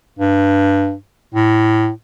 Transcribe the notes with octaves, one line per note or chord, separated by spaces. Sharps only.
G2
A2